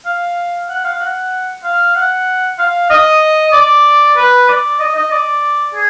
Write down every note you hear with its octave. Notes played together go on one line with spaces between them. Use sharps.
F5
F#5
F5
F#5
F5
F#5
F5
D#5
D5
B4
D5
D#5
D#5
D5
G#4